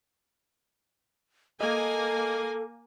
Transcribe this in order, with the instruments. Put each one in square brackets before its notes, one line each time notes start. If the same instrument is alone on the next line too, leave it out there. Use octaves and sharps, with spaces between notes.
[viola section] A#3 G#5 [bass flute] A4 [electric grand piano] D#5